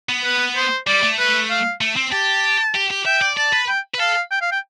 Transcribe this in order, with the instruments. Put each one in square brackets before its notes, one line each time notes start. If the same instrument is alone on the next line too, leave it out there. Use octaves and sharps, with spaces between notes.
[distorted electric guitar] B3
[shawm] B4
C5
[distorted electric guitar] G3 [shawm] D5
[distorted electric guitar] A3
[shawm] B4
F5
[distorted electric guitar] A3
C4
[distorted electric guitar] G4 [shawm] A5
[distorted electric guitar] G4
G4
[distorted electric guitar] E5 [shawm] G5
[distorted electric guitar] D5
[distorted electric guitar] D5 [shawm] A5
[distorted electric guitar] B4
[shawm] G5
[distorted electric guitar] B4
[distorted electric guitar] A4 [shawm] F5
[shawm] G5
F5
G5